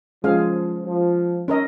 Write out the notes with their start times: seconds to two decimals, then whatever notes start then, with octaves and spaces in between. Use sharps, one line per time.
0.24 F3 G#3 C#4 G#4 F5
0.86 F3
1.48 C#4 A#4 D#5